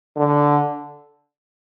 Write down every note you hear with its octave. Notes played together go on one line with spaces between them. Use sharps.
D3